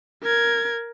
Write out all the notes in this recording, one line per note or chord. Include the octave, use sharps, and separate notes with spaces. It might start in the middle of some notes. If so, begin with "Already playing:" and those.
A#4 G#6